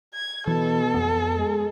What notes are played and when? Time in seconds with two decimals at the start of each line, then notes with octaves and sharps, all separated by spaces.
0.14 G#6
0.47 B2 E3 A4
0.94 F2 B3
1.36 G#3